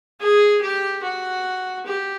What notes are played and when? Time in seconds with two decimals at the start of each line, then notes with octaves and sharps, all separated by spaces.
0.20 G#4
0.62 G4
1.03 F#4
1.86 G4